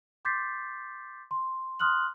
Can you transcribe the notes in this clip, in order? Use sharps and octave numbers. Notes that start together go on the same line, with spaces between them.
C6 D6 G6 A6 B6 C7
C6
C6 D#6 F6 F#6 F#7